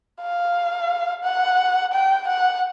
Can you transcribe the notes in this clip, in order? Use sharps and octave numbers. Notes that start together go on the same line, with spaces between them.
F5
F#5
G5
F#5